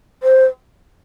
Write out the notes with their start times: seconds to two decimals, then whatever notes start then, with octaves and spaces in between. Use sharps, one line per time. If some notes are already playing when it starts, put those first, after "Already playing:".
0.23 C5